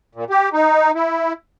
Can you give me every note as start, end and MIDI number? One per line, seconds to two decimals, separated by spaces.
0.15 0.24 46
0.30 0.49 67
0.53 0.91 63
0.95 1.33 64